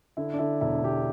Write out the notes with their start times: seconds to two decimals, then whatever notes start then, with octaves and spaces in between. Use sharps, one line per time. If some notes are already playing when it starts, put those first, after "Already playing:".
0.17 D3 E4
0.33 D4
0.39 D3 E4
0.61 E1 E4
0.83 E1 G4